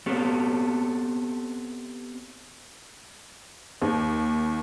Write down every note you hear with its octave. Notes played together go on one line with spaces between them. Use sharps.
B3 C4 G4 A4 C#5
D#2